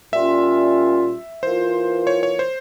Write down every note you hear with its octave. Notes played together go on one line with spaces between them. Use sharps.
A#2 G3 C#4 F4 E5
E3 A#3 F4 C5
C#5
C#5
C5